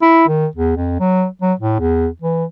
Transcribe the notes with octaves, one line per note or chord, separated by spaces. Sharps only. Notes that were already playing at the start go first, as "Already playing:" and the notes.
E4
D#3
E2
F2
F#3
F#3
A2
E2
E3